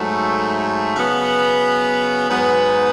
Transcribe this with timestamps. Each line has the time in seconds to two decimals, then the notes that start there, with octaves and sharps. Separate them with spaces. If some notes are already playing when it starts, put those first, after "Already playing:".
Already playing: G#2 F#3 A3
0.96 C#3 F#3 B3
2.29 G#2 F#3 B3